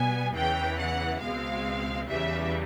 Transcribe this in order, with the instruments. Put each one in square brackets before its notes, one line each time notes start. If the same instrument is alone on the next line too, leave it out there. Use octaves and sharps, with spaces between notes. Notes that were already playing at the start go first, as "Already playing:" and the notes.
Already playing: [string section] B2 G3 B3 G#5
E2 C#3 E3 G5
F#5
C#2 B2 G#3 C4 F5
E2 C#3 E3 G3 E5